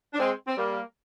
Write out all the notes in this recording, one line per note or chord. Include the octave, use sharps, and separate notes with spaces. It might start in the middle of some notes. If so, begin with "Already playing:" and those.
D4
G#3 C4
C4
G3 A#3